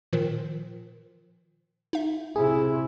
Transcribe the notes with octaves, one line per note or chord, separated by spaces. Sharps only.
A#2 D#3 F3
D#4 E5
C3 E4 G#4